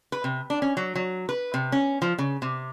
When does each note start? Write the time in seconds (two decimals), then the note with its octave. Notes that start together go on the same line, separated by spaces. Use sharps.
0.12 B4
0.24 C3
0.50 D4
0.62 C#4
0.77 F#3
0.95 F#3
1.29 B4
1.54 C3
1.72 C#4
2.02 F3
2.19 C#3
2.42 C3